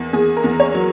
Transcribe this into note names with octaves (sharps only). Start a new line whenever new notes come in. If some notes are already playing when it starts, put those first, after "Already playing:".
Already playing: E2 A#3
E2 G#4
A#4
E2
C#5
F#3